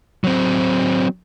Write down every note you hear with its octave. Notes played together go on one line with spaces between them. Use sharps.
F#3 C4